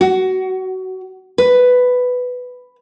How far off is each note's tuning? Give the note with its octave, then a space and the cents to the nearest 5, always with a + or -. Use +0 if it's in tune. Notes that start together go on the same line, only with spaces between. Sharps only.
F#4 +20
B4 +10